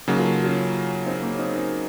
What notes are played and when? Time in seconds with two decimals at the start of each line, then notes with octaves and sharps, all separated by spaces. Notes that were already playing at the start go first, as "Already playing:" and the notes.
0.08 C#3 F#3 A#3 D#4 F#4
0.19 F4 A4
0.44 C#4 F4
1.06 C4 D#4
1.22 A#3 C#4
1.39 C4 D#4
1.55 C4 D#4